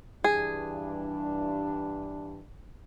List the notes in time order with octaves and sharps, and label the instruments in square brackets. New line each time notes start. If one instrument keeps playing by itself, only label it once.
[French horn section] G2 E3 D4 [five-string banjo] G#4